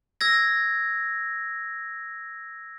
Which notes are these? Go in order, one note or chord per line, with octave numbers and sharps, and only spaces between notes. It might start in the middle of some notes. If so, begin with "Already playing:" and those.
E6 G#6 A#6